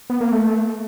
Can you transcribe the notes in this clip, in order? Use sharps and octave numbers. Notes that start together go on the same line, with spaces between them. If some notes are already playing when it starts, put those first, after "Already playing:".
B3
A#3
A3